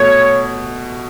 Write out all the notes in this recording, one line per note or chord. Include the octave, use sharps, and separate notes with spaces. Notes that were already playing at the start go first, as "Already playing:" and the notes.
Already playing: B2 A3 C#5